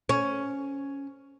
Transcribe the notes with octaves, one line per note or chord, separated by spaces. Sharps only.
C#4